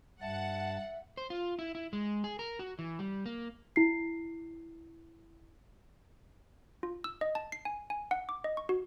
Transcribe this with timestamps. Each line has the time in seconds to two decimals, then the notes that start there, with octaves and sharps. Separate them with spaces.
0.21 G2 E5 F#5 A5
1.17 C5
1.30 F4
1.59 E4
1.75 E4
1.93 G#3
2.24 G#4
2.39 A#4
2.59 F#4
2.79 E3
2.99 G3
3.26 A#3
3.76 E4 C7
6.83 F4
7.04 E6
7.21 D#5
7.35 A5
7.52 C7
7.65 G#5
7.90 G#5
8.11 F#5
8.29 D6
8.44 D#5
8.57 C#6
8.69 F#4